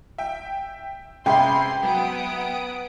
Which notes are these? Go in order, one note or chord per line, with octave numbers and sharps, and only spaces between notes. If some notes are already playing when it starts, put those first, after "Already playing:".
E5 G5
C3 C#4 G#4 B4 E5 G5 C6
F#3 B3 D#6 D7